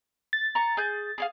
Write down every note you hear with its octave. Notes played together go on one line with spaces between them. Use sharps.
A6
A#5 C#6
G#4 G6
G#4 C#5 F5